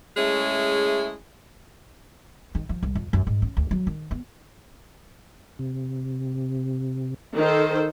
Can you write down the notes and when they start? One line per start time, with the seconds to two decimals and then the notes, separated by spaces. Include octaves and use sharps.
0.17 G#3 A3 C#4 E4 G#4
2.55 D#3
2.69 F3
2.83 C2
2.95 F2
3.13 F#2
3.27 G#2
3.42 C#4
3.57 D2
3.71 F#3
3.87 D#3
4.11 B3
5.59 C3
7.36 D#3 A4 C5